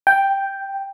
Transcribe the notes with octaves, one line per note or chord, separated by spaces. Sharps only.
G5